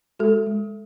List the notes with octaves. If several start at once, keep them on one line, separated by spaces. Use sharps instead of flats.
G#3 F#4 A4
G#3